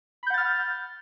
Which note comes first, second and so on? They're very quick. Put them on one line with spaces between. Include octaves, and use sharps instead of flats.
B5 G6 F#5 A6 F6